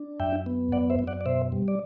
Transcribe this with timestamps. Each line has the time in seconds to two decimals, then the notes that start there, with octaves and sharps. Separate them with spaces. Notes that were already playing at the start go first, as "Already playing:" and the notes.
Already playing: D4
0.20 F#2 E5 G5
0.46 B3
0.72 F#2 D5 F#5
0.90 C5 E5
0.99 F#2
1.07 D5 F#5
1.21 D5
1.26 B2 C5 E5
1.52 G3
1.68 D5